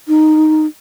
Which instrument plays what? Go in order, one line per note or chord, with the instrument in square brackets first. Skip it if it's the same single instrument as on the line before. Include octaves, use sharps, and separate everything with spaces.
[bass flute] D#4